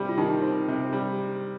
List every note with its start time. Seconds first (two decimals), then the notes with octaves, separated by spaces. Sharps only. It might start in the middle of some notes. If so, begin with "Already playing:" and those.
Already playing: C3 G3
0.09 F4
0.17 D#3 D#4
0.42 C4
0.68 C3
0.93 G3